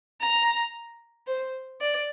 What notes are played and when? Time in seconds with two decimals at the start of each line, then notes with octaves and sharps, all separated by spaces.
0.21 A#5
1.27 C5
1.81 D5